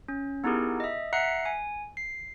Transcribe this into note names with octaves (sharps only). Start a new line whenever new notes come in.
C#4
B3 D#4 E4 G4 G#4 A#4
D#5 E5
E5 F#5 A#5 F#6 C7 C#7
G#5
C7